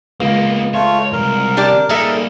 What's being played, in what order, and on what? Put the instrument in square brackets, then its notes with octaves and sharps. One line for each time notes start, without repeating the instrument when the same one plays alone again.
[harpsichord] C#2 [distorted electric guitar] A#3 B3
[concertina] A3 F4 [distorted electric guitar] C#5
[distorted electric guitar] C2 G#2 [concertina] A#4
[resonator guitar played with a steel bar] D4 G4 D5
[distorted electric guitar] G3 A#3 [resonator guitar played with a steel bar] D#4 A4 E5 [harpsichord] G#4